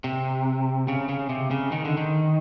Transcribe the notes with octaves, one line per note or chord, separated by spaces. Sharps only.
C3
C#3
C#3
C3
C#3
D#3
D3
D#3